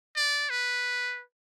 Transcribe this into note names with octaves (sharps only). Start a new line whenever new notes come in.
D5
B4